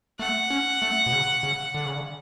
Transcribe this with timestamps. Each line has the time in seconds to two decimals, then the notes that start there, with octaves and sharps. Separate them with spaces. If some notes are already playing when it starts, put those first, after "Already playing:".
0.19 A3 F#5
0.50 C#4
0.82 A3
1.06 B2
1.13 C#3
1.43 C#3
1.75 D3
1.85 C#3
1.95 D3